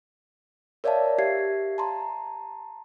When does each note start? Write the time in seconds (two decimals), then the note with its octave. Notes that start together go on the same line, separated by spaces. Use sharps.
0.84 A#4 C#5 D5 E5 F5 A5
1.18 G4 E5 F5 G#6 C7
1.78 A5 A#5 C6